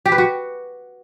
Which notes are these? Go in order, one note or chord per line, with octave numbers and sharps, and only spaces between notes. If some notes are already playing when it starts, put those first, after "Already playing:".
G4
B4
F#4